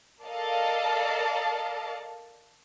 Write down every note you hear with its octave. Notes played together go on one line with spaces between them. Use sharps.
A4 A#4 D5 D#5 F5 A5